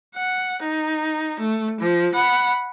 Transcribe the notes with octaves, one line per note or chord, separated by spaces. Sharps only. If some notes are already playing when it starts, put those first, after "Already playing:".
F#5
D#4
A3
F3
F#5 B5